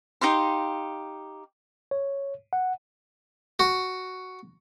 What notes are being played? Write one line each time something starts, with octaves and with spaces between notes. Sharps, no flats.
D#4 G4 F5 C6
C#5
F#5
F#4